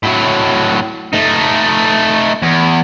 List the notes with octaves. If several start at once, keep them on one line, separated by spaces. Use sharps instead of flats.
A2 F#3
A3 D#4
E2